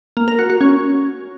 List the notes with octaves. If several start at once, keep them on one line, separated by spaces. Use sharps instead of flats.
A#3
A#4
F#4
F#4
C#4